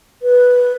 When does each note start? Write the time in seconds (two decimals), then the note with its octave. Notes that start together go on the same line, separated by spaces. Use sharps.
0.22 B4